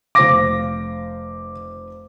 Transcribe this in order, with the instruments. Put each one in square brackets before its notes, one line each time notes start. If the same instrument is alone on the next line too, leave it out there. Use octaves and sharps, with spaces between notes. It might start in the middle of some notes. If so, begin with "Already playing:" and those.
[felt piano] F1 C5 F5 [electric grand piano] D6 A#6